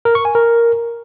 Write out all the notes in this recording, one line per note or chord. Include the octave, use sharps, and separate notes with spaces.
A#4
C#6
G#5
A#4